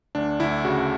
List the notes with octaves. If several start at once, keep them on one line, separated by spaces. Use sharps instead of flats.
D2 D4
D2 E4
C#3 F#4